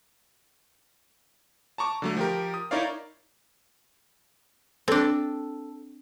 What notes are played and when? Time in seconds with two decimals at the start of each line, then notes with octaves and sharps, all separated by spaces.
1.78 A5 A#5 C#6 D6
2.02 D3 F#3 A3
2.17 F3 G4 A#4
2.54 D#6
2.71 D#4 E4 A#4 C#5 D5 F5
4.88 C4 D4 A4